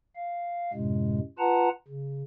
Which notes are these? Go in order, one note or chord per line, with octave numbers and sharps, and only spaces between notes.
F5
F#2 A2 C3 G#3
F4 B4 F#5 A5 A#5
C#3